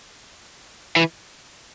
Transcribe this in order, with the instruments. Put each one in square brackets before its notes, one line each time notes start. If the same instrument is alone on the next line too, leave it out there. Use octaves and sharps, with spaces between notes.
[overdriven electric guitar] E3